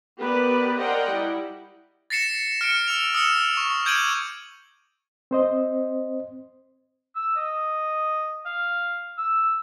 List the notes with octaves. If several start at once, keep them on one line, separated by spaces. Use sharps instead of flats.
B3 G4 A#4 B4 D5
A#4 C5 D5 D#5 F#5 G5
G3 E4
A6 A#6 C7 C#7 E7
F6 C#7 D7
E6 F7
D#6 E6 C#7 E7
C#6
D6 G6 G#6 D7 D#7 F#7
C4 C5 D#5
E6
D#5
F5
E6